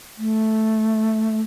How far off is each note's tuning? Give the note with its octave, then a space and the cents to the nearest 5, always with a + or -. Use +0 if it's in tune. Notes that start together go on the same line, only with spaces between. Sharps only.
A3 -5